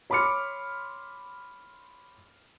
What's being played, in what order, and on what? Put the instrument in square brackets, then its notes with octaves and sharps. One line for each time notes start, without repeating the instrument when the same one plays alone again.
[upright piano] C#5 B5 C6 D6 F6 C#7